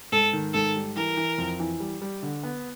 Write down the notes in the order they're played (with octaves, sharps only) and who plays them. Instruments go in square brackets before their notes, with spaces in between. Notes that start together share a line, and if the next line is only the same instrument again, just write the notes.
[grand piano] G#2 [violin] A4
[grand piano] D#3
[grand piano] G#2 [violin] A4
[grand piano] G3
[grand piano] E3 [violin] A#4
[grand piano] E3
F2
E3
G3
G3
D3
B3